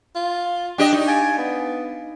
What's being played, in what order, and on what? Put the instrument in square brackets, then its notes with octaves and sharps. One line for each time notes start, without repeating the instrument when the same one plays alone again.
[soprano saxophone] F4
[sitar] D4 G4 D#5 [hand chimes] G5 D6
[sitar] D#4 [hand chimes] G4 D5
[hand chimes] F5 A6 D7 [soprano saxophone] G#5
[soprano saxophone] B3